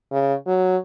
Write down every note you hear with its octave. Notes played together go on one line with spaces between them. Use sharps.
C#3
F#3